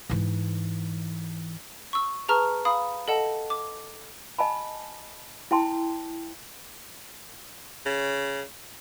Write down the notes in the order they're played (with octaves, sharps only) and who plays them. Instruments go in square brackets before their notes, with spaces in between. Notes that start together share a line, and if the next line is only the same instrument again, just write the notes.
[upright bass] G#2 E3
[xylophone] C#6 E6
G#4 B4 A5 A#5 C#6 F6
F5 B5 D#6
A4 D#5 F#5 A5
D6
[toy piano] D#5 G#5 A5 B5
E4 G5 A5 C6
[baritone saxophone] C#3